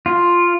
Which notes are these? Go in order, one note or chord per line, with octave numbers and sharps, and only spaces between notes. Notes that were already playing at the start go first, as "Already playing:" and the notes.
F4